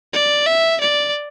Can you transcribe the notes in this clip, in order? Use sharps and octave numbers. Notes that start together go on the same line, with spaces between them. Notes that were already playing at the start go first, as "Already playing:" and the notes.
D5
E5
D5